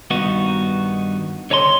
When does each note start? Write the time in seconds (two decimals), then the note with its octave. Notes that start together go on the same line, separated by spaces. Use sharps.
0.10 G2 D#3 B3 D#4 F#4
1.50 D3 C#5 D#5 A5 C6